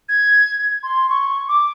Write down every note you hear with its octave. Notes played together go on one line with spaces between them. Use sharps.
G#6
C6
C#6
D6